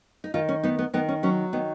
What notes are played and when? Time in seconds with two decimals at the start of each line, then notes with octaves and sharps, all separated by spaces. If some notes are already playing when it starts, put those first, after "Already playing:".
0.24 D#4
0.34 D#3 F4
0.49 C#4
0.63 B3 D#4
0.79 B3
0.94 D#3 B3
1.08 C#4
1.23 F#3 C#4
1.53 D#3 B3